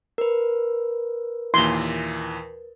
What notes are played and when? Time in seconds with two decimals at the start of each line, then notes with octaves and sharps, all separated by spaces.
0.18 A#4 B4
1.54 D#2 A#2 E3 C6